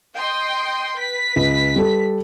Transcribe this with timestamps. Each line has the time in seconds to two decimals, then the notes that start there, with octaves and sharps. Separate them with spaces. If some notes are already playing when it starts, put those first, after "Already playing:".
0.14 D#5 G5 C6
0.98 B4 B6
1.36 C#2
1.76 G3 A4